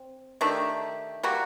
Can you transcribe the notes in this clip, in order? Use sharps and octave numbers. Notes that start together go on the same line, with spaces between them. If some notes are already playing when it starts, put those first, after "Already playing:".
Already playing: C4
D#3 A3 D4 G4
G3 A#3 F#4